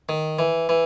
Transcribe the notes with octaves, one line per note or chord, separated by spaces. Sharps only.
D#3
E3
E3